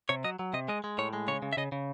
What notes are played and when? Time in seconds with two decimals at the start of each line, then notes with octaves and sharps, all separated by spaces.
0.09 C3 C#5
0.24 F#3 D#5
0.39 F#3
0.53 C3 D#5
0.68 G#3 D#5
0.84 G#3
0.98 A2 C#5
1.13 G#3
1.28 C#3 C#5
1.42 C#3
1.53 E5
1.57 C#3 D#5
1.72 C#3